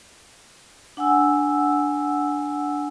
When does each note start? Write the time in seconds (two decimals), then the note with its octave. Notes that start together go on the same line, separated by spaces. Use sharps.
0.97 D4 F#5 G#5 E6